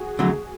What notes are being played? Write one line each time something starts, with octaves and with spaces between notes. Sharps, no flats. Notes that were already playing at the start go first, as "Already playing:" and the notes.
Already playing: F#4 G#4
F2 D3 F#3 A3